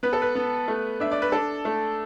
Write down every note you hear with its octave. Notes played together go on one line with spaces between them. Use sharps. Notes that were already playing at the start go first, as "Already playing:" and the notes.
B3 B4
A4
B4
B3
A3
D4 E5
D5
B4
D4 A4
A3